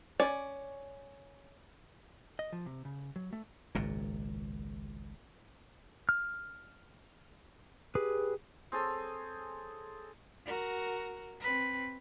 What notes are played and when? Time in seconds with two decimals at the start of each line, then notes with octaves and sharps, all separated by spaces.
0.20 C#4 D5
2.39 D#5
2.53 F3
2.66 C3
2.85 C#3
3.16 F#3
3.33 A3
3.75 G#1 C#2 A#2
6.09 F6
7.95 G4 G#4 B4
8.72 C4 G#4 A4 C#5
10.46 F#4 A#4
11.40 C4 B4